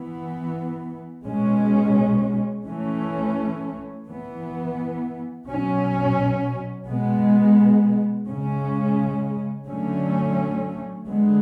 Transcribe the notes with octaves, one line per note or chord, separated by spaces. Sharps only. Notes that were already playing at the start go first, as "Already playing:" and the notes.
Already playing: E3 B3
B2 G#3 C#4
E3 A3 C#4
E3 B3
B2 F#3 C#4
B2 G#3 B3
C#3 G#3 C#4
D3 F#3 A3 C#4
D3 G#3 B3